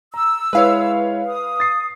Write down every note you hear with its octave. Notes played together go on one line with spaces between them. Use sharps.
A#5 E6
G#3 E4 B4 C#5 F5
D#6
A6 C7